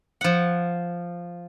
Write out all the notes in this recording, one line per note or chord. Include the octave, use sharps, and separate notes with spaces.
F3 F#5